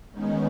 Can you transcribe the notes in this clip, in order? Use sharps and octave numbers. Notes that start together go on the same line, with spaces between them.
D#3 G#3 B3 C#4 D#4